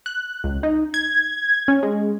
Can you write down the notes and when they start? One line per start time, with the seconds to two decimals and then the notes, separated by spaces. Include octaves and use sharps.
0.06 F#6
0.44 C#2
0.63 D#4
0.94 G#6
1.68 C#4
1.83 G#3